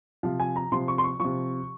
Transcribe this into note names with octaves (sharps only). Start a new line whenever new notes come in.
C3 F3 F5
G#5
A#5
C3 F3 C6
C#6
C6
C#6
C3 F3 C#6